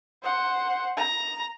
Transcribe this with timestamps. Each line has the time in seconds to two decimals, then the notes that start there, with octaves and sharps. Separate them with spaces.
0.23 C5 F#5
0.97 A#5